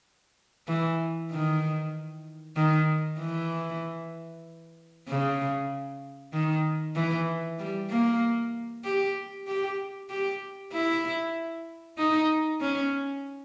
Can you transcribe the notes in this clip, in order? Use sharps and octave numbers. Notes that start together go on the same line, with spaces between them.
E3
D#3
D#3
E3
C#3
D#3
E3
G3
A#3
G4
G4
G4
E4
D#4
C#4